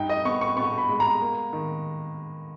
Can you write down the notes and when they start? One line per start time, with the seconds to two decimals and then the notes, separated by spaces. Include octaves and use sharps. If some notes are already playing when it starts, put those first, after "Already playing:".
Already playing: G2 D#4 G5
0.09 D#5
0.25 B3 C#6
0.41 C#6
0.57 B3 C#6
0.78 B5
0.89 G#3
1.00 A#5
1.22 A#3
1.53 D#3